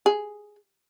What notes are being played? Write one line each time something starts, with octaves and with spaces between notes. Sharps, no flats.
G#4